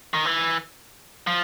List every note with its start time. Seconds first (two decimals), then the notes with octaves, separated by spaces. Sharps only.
0.14 D#3
0.25 E3
1.27 F3